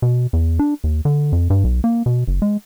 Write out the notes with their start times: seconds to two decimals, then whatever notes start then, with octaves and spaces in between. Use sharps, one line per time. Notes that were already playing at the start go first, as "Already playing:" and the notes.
0.02 B2
0.33 E2
0.59 D4
0.84 D#2
1.05 D3
1.32 F2
1.50 G2
1.64 B1
1.84 A#3
2.06 B2
2.28 F#1
2.42 G#3